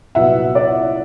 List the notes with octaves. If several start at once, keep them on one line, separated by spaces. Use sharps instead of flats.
C2 A#2 F#3 B3 E5 F#5
D5